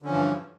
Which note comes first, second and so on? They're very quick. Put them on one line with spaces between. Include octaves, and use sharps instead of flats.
D3 C#4 F3 E3 G2